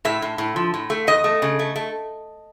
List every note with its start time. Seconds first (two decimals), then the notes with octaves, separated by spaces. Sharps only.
0.05 A2 E5
0.22 A2
0.38 A2
0.56 F3
0.74 A2
0.90 A3
1.07 E2 D#5
1.24 A3
1.42 C#3
1.59 A3
1.76 A3